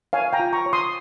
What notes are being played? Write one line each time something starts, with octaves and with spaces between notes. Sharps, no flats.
C#5 F5 G#5
G5 A#5
F4
A#5 C#6
C#5
C6 D#6